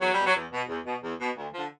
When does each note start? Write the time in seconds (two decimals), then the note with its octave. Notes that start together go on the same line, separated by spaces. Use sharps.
0.01 E2 F#3
0.14 B2 G3
0.26 F#3
0.35 E2
0.52 B2
0.69 E2
0.85 B2
1.03 E2
1.19 B2
1.37 D2
1.53 D3 F3